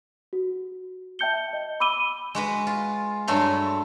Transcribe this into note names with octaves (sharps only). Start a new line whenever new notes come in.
F#4
E5 G5 A5 G6 C#7 G7
D#5
B5 D6 E6 D#7 G7
G#3 F#4 B4
F4
G2 F#3 A3 C6